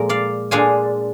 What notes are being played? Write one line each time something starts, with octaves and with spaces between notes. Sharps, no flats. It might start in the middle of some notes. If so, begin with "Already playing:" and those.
Already playing: A#2 F3 G#3 A#4
D5 F5
A#2 G#3 D4 F5 G#5